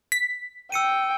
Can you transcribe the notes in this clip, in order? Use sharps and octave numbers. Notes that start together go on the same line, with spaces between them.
B6
G5 E6 C#7 D#7